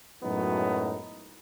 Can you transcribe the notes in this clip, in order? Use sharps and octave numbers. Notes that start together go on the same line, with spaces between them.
F#2 A2 F#3 G#3 B3 D#4